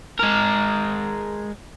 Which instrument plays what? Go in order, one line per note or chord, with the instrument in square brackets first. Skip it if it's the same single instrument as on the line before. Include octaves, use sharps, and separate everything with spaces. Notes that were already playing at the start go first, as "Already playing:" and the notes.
[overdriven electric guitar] G#3 A#4